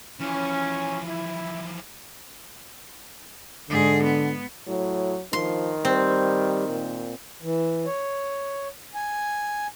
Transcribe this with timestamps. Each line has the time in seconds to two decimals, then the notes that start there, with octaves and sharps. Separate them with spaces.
0.20 E3 F3 C#4
1.09 E4
3.70 G#2 D3 G#4
4.03 B3
4.68 A2 F#3
5.33 D#3 F3 C6
5.85 G3 C4
6.69 A#2
7.42 E3
7.86 C#5
8.95 G#5